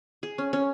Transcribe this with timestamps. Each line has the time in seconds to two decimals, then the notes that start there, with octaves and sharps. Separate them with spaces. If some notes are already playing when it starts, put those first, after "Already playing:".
0.23 G#4
0.38 C#4
0.53 C#4